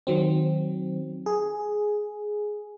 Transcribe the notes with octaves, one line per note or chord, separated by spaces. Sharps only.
D#3 F#3 C4
G#4